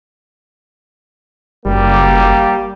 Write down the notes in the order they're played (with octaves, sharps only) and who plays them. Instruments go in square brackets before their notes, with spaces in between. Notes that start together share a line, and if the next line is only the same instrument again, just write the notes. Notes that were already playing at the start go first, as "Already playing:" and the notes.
[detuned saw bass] F#1 [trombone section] G3 A#3